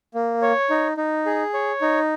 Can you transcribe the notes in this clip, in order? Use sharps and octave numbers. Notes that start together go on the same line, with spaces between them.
A#3
C#5
D#4
D#4
G#4
C#5
D#4